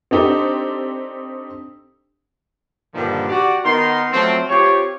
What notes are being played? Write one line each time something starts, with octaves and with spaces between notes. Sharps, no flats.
C4 D4 D#4 G4 A4
G2 A#2 D3 D#3 F3 G3
F#4 G4 D5
D#3 B3 D#4 A#4 C6
F3 F#3 A3 C4
C4 F4 G4 C#5